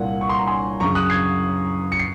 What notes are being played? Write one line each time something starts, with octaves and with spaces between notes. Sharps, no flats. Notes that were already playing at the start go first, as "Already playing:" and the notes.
Already playing: C2 A#2 F#5
C#6
C6
A#5
G#5 C6
F#2 C#3 A#5 C#6
D#6 F#6
G#6 C7
C#7
C7